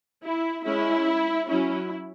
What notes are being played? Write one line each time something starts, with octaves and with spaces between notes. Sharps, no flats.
E4
G#3 C#4 E4
F#3 C#4 E4